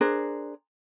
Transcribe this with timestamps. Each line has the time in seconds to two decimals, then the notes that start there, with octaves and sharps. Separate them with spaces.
0.01 D4 G#4 A#4 C5